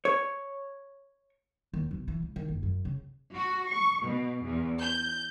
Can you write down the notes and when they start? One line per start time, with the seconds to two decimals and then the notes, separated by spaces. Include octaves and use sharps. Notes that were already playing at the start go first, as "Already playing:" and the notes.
0.05 C#5
1.73 D#2
1.91 B1
2.08 E3
2.22 C#2
2.36 D#3
2.48 F#1
2.63 F#2
2.85 C#3
3.35 F#4
3.68 C#6
4.03 B2
4.45 E2
4.81 G6